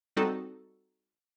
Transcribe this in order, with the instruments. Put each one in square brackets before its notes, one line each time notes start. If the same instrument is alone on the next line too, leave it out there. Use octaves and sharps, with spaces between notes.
[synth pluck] G3 C4 D#4 F#4 A4